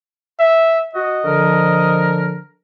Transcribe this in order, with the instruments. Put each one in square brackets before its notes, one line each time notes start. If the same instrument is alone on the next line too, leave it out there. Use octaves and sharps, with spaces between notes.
[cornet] E5
[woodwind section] F#4 [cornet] D#5
[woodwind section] D3 F3 A#4